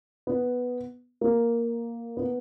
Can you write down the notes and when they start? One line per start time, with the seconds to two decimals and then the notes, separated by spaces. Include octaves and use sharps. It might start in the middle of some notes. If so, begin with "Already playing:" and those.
0.27 B3
1.21 A#3
2.17 B3